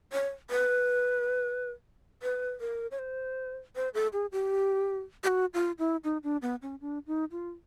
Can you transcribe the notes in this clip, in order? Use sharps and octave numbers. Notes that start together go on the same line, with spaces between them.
C#5
B4
B4
A#4
C#5
C5
C5
A4
G#4
G4
G4
F#4
F4
E4
D#4
D4
B3
C#4
D4
D#4
F4